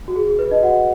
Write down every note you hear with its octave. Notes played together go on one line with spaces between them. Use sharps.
F#4
G#4
G#4
B4
D#4 D#5
F#4 F#5